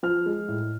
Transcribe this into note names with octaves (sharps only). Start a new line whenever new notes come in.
F3 F6
G#3
A2